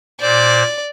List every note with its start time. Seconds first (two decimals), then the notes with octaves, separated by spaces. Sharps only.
0.21 A#2 C5 D5